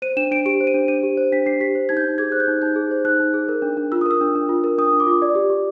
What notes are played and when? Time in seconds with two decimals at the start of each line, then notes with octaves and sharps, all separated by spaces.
0.02 C5 D#7
0.17 D4 E7
0.31 D4 D7
0.46 G4 D7
0.61 C5
0.67 D#7
0.74 D4
0.88 D4 D#7
1.03 G4
1.17 C5
1.32 D4 B6
1.46 D4 C7
1.60 G4 B6
1.75 C5
1.89 D#4 G#6
1.97 G6
2.05 D#4
2.18 G#4 G#6
2.32 C5 F#6
2.40 G6
2.48 D#4
2.62 D#4 G6
2.76 G#4
2.91 C5
3.05 D#4 F#6
3.20 D#4
3.34 G#4
3.49 A#4
3.62 D4
3.77 D4
3.92 F4 E6
4.01 D#6
4.06 A#4 E6
4.21 D4
4.35 D4
4.49 F4
4.64 A#4
4.78 D4 D#6
4.93 D4
5.00 D6
5.07 F4
5.22 D5
5.35 G4
5.50 G4